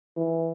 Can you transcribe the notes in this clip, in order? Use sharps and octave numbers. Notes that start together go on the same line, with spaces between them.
E3